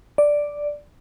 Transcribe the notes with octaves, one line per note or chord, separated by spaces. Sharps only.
D5